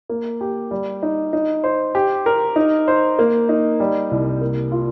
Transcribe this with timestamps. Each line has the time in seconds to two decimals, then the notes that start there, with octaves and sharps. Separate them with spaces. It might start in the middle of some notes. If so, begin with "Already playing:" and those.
0.09 A#3
0.41 G4
0.71 G3
1.03 D#4
1.33 D#4
1.64 C5
1.95 G4
2.26 A#4
2.56 D#4
2.88 C5
3.19 A#3
3.49 D#4
3.80 G3
4.11 C2
4.41 A#3
4.72 F4